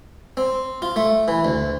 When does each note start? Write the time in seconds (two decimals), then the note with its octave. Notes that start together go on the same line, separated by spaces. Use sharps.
0.37 C4
0.82 F4
0.96 A3
1.28 E3
1.45 D2